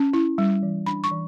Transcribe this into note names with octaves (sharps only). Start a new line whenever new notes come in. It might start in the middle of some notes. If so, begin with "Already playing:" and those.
Already playing: C#4
E4
G3
E3
D4 B5
C#6
E3